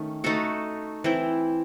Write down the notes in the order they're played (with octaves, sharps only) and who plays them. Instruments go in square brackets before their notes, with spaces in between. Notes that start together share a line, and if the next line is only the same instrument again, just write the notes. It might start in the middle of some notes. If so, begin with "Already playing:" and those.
Already playing: [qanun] D#3 A3 C#4
A3 D#4 F#4 A4
E3 C4 E4